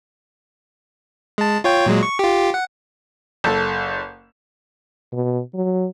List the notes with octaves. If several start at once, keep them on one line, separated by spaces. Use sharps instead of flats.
G#3 A5
F4 C#5 G5
A#2 F#3 G#3
C#6
F4 G4
F#5
F#1 A4
B2
F#3